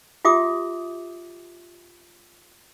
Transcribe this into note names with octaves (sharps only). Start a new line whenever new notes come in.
F4 G4 E5 D6 D#6